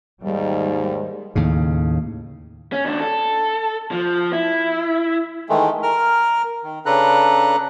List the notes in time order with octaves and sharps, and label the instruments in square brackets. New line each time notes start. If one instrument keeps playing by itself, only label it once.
[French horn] D#2 [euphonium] G#2 [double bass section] D#3 G3
[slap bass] D#2 A2 C#3
[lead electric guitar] C#4
D#2 D4
A4
F3
E4
[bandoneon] D#3 E3 G#3 A3
A#4 F6
D#3
C#3 D4 A4 B4 A#5 F#6